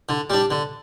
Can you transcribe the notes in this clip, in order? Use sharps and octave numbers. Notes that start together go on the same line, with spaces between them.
D3
G3 D4
D3